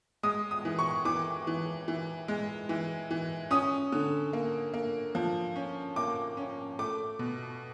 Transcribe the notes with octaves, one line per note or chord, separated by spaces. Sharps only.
G#3 D#6
D#6
E3
C#6
E3 D6
E3
E3
G#3
E3
E3
C#4 D#6
D3
A#3
A#3
F3
C#4
A#3 D6
C#4
A3 D6
B2